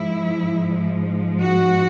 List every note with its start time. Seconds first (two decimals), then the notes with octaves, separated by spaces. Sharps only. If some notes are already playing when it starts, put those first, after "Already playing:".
Already playing: G#2 F3 G#3 E4
1.40 F#4